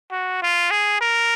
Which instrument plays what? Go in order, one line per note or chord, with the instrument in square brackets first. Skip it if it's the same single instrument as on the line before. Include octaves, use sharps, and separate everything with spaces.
[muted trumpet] F#4
F4
G#4
A#4